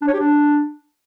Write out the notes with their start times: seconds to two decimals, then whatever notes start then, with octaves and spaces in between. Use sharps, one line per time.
0.02 D4
0.08 C#5
0.14 G4
0.20 D4